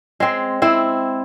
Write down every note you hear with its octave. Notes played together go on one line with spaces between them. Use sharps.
G#3 C4
C4 E4